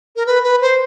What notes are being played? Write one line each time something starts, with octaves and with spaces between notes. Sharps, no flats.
A#4
B4
B4
C5